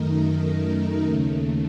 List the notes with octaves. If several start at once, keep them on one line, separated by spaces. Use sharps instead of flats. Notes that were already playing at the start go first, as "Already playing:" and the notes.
Already playing: F#2 D#3 A3 D#4 A#4
D#2 C#3 A3